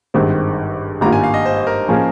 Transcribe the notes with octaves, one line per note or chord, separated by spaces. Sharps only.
G#1 G2 D#3 G#3 C4
G#1 G2 G3 A#3 F4 A#5
G#5
F5
D#5
C5
A#4
F3 A#3 C#4 G#4